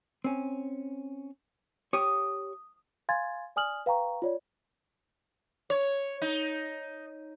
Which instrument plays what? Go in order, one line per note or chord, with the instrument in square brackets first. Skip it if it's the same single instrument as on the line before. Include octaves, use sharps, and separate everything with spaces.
[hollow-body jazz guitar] C4 C#4
[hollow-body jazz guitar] G4 C#5 [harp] D#6
[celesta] F5 G#5 C6 G#6 A6
D5 G#5 D#6 F6 F#7
B4 F5 G5 A#5 C#6
F4 C#5 D5
[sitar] C#5
D#4